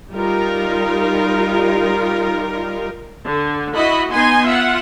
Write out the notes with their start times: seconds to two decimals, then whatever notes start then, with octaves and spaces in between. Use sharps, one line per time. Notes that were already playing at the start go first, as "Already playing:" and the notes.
0.12 G3 D#4 F4 A#4
3.26 D3
3.75 E4 F#4 D#5 B5
4.12 B3 D#4 G#5 C6
4.46 F4 E5 F#5